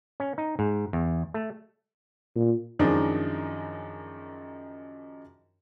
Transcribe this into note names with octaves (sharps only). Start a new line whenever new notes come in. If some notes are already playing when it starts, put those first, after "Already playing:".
C#4
D#4
G#2
E2
A3
A#2
F#2 D#3 F3 G#3 D4 D#4